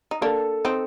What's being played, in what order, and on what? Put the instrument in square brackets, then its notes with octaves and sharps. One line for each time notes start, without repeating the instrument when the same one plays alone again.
[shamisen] D#4
[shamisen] A#3 D4 [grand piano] A4
[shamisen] C4 D#4